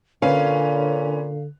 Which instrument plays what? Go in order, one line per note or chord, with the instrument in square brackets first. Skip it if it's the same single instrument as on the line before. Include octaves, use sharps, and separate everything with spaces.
[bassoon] A#2 [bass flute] D3 [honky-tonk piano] C#4 B4 [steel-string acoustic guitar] F5